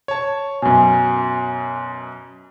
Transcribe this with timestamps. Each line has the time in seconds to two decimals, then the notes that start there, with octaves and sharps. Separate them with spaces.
0.08 C#5 A5
0.62 F#2 B2 G#5